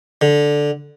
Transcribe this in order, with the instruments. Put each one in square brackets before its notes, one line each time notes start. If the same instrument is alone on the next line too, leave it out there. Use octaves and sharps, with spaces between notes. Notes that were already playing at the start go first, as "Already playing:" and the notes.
[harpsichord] D3